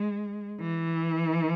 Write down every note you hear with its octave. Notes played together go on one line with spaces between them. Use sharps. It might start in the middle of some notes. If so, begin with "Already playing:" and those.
Already playing: G#3
E3